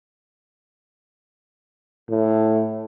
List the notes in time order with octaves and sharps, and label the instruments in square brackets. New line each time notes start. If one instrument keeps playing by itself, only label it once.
[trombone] A2